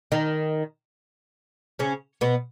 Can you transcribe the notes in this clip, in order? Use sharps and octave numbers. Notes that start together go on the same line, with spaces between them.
D#3 D#4
C#3 C#4
B2 B3